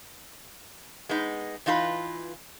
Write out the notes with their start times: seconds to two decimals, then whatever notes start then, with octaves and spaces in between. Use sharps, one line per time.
1.09 G#3 B3 D#4
1.66 E3 D#4 F4 A4 B4